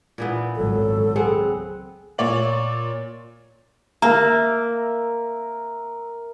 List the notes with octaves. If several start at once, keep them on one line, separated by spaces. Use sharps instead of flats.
A#2 E3 B3
G#1 C#2 F#3 A4
B3 C4 G#4 F#5
A#2 C#5 D5 F#7
A#3 A#4 E5 A#5